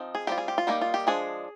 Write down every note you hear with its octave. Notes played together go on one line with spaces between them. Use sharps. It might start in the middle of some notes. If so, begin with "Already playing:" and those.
Already playing: F3 C4 D#4
G#4
G3 C4 F4 G4
G#4
G4
F4
G3 A#3 D#4 G4
F4
G4
F3 G#3 D4 G#4